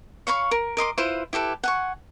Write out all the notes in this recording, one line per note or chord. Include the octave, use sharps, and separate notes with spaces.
C#5 F5 B5 C#6
A#4
A#4 D#5 C6 D6
E4 F4 B4 C5
E4 G4 A4 B4
F#5 G#5 C#6